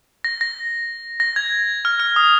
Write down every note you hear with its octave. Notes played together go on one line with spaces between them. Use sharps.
A#6
A#6
A#6
G#6
F6
F6
D#6